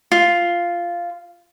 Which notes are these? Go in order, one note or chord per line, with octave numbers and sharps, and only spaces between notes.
F4